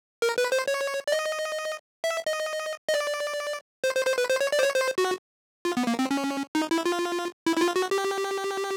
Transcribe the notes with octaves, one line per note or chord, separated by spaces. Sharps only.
A#4
B4
C5
C#5
D5
D#5
E5
D#5
D#5
D5
C5
C5
C5
B4
C5
C#5
D5
C5
C#5
C5
F#4
F4
B3
A#3
C4
C#4
D#4
E4
F4
E4
E4
F4
F#4
G4